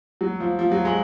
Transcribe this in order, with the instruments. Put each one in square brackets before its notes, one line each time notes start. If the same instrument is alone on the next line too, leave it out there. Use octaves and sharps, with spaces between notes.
[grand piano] F#3
F3
F3
F#3
G#3